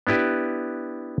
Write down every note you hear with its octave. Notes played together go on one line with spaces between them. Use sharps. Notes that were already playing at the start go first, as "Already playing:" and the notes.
B3 D4 E4 G4 B4